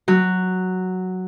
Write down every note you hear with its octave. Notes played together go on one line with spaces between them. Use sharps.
F#3